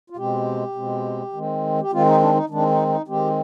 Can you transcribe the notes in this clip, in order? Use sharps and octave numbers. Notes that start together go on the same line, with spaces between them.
F4
B2 G#3 C4 G4
B2 G#3 C4
D#3 G#3 C4
G4
D#3 G#3 C4 F4
D#4
D4
D#4
D#3 G#3 C4 D4
D#4
D#4
D#3 G#3 C4 G4